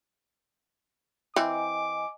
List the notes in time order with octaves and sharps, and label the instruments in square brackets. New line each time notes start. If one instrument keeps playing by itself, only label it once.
[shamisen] E3 C4 [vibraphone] D#5 G#5 [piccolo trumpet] D6